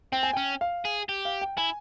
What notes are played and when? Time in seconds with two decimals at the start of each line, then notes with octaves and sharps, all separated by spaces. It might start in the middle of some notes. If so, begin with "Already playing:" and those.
0.12 C4 G5
0.23 G#5
0.33 C#4 G5
0.61 F5
0.85 G#4
1.09 G4
1.25 F5
1.41 G5
1.57 E4 G#5